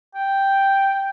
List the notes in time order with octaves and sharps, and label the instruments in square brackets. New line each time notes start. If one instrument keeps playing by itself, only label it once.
[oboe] G5